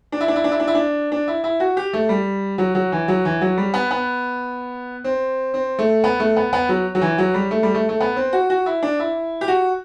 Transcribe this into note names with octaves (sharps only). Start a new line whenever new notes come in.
D4
E4
D4
E4
D4
E4
D4
E4
D4
D4
E4
E4
F#4
G4
A3
G3
F#3
F#3
E3
F#3
E3
F#3
G3
B3
B3
C4
C4
A3
B3
A3
B3
B3
F#3
F#3
E3
F#3
G3
A3
G3
A3
A3
B3
C4
F#4
F#4
E4
D4
E4
G4
F#4